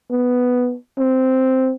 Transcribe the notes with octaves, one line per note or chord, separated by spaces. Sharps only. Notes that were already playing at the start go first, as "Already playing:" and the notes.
B3
C4